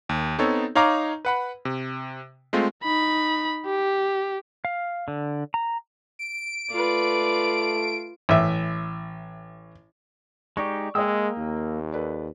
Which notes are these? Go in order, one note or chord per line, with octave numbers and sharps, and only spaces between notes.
D#2
B3 C4 D#4 A4 C#5
D#4 C#5 F5 A#5 D6
B4 F#5 B5
C3
G#3 A3 C4 F4
D#4 B5
G4
F5
D3
A#5
D7
A3 F4 B4 D5
A1 E5
G#3 D#4 G4 D5 C#6
G#3 A#3 D#5 G5 D#6 E6
D#2
A4 B4 D5